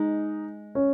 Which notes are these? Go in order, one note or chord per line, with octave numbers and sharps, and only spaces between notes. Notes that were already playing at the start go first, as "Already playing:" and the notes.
Already playing: G#3 D#4
C#4